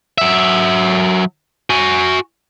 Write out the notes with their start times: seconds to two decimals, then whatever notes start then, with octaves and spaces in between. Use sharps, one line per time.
0.18 F#3 E5
1.70 F#4 G#5